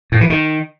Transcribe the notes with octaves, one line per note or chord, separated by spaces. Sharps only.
A2
E3
D#3